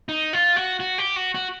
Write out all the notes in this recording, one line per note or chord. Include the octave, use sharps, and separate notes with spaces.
D#4
F4
F#4
F#4
G4
F#4
F#4